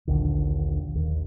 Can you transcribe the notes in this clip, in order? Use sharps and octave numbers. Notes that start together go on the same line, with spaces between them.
A#1 D#2 D3
D#2